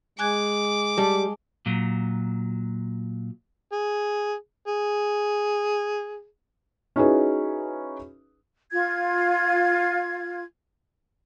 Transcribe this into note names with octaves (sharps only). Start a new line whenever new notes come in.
G#3 G#5 D6 F#6 G#6
G3 A5
A#2 F#3
G#4
G#4
C#4 D#4 E4 F#4 G#4 B4
F4 G#6